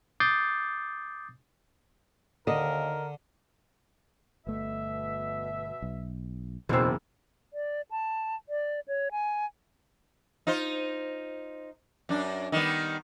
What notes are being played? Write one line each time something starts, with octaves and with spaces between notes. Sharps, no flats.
D6 D#6 G6 A6 C7
D#2 D3 A#4 D#5
G1 B2 A3 E5
B1
F#1 E2 B2 E3 F#3 C4 E6
D5
A5
D5
C#5
G#5
D#4 F4 C5
F#2 D4
D#3 G3 B3